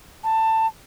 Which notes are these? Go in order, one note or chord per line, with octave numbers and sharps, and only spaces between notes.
A5